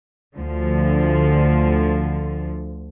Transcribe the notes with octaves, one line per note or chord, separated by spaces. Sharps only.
D2 D3 F3